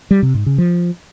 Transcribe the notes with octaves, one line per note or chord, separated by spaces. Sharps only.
G3
C3
G#2
C#3
F3